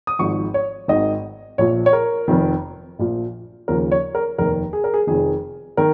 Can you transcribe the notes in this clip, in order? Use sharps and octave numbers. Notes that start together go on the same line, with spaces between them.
D#6
G#1 G#2 F3 C#6
C#5
G#1 G#2 D#3 D#5
A#1 A#2 F3 C#5
C#5
A#4
F1 F2 D#3
A#1 A#2 F3
D#2 C#3 F3 A#4
C#5
A#4
F1 D#2 D#3 A#4
G#4
A#4
G#4
F1 F2 D#3 G#4
D#3 A#4